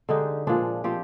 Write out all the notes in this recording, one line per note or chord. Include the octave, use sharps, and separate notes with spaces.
D3 G#3 D#4 G4
A#2 F3 G#3 D4
F3 C4 G4